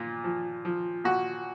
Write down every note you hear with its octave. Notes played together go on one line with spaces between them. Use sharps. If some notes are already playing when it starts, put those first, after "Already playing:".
Already playing: A#2 F4
F3
F3
A#2 F#4